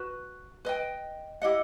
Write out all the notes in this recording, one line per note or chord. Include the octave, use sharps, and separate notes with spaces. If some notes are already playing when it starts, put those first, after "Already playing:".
Already playing: F#4 B4
B4 D#5 G5
E4 G4 D#5 F#5